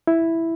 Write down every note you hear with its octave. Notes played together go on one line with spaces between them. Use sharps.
E4